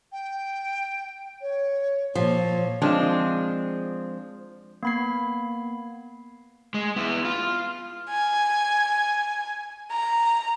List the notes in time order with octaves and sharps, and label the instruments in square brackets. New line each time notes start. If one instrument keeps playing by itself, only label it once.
[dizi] G5
C#5
[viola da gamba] A#2 [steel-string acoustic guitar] F3 [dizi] C#5
[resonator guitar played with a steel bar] F3 G#3 C4 D4
[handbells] A#3 B3 B5 G#6 C7
[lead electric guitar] G#3
B3 E4
F4
[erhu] G#5
A#5